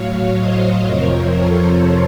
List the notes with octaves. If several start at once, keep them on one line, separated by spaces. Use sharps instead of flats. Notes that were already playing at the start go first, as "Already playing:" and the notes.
Already playing: A2 F#3 C#5 F5
C5 D#5
F2 C3 F3 A#4 C#5
A4 C5